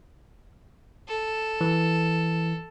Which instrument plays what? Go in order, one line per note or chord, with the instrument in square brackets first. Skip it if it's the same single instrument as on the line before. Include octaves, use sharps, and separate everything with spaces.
[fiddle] A4
[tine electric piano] E3